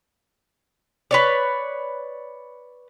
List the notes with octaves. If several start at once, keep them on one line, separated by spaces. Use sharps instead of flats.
B4 C#5 D5